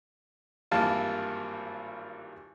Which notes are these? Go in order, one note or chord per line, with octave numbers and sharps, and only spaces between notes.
G#1 G2 E3 A#3 F4 A5